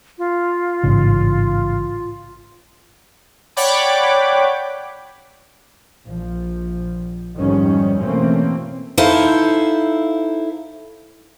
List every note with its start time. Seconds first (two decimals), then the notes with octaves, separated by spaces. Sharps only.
0.18 F4
0.83 A1 G#2 C#3
3.56 C#5 D5 F#5 G5 B5 D6
6.07 A#1 F3
7.35 F2 G#2 D#3 F3 G3 C#4
8.00 B2 E3 A3 A#3 C4 C#4
8.98 D#4 E4 A4 C5 F5